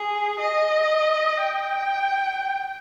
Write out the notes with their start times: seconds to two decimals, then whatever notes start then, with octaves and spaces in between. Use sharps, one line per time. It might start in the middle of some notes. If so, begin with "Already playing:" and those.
Already playing: G#4
0.39 D#5
1.40 G5